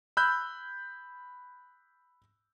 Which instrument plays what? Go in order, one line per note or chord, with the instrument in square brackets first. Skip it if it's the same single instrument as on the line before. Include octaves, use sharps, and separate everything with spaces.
[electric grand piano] B5 E6 F#6 G6